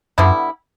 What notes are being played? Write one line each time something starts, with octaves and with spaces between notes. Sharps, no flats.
F#2 D3 G3 B3 E4